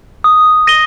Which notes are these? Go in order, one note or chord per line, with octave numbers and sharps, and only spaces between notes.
D#6
A#6 D#7 G7